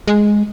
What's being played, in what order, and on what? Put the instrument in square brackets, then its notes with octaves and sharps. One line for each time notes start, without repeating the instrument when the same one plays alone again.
[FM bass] G#3